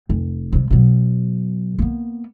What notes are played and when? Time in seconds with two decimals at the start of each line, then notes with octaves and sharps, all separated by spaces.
0.09 F1
0.52 C3 G3
0.70 B2 F#3
1.78 A#3 B3